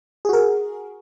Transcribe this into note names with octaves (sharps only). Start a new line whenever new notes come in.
F#4 G#4 A#4